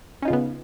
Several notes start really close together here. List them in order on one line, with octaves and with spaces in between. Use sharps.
C#4 D#4 F4 C#3 B3